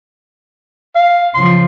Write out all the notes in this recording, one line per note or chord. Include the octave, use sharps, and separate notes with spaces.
F5
C#3 F3 C6